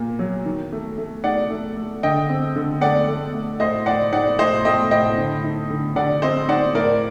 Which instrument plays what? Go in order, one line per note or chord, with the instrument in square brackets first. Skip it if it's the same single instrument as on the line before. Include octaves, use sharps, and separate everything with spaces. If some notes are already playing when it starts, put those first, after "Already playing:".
Already playing: [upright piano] A#2 A#3
F#3
D#3
A3
A3
D#4 D5 F#5
A3
A3
D3 D#5 G5
C4
D3
A3 D5 F#5
A3
A3
A2 C5 D#5
A2 D5 F#5
D#4 D5 F#5
A2 C5 D#5
A3 D#5 G5
A2 D#5 G5
D3
D#4
D3
D3 D5 F#5
C4 C5 D#5
D#4 D5 F#5
A2 A#4 D5